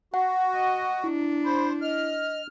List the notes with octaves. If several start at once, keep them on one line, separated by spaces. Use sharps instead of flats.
F#4 F#5
D#5
D4 E4
C5 B5
D#5 F6